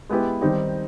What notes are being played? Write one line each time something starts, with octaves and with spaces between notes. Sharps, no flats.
G#3 B3 E4 G4 B4
D#3 G3 C4 D#4 G4